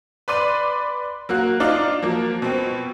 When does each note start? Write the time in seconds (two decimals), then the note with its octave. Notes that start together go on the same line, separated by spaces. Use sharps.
0.28 B4 D5 C6 D#7
1.29 F#3 A#3 F#4
1.60 D4 D#4 F4
2.03 F3 F#3 A#3
2.42 B2 C4